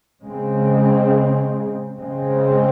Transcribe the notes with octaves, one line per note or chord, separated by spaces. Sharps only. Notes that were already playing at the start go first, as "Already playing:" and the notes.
C#3 G#3 C4
C#3 G#3 C4